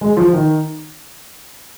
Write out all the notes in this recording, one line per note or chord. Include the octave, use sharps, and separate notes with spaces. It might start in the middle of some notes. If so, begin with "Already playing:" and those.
G#3
F3
D#3